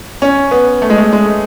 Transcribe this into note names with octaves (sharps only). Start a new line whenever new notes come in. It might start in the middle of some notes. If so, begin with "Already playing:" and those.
C#4
B3
A3
G#3
A3
G#3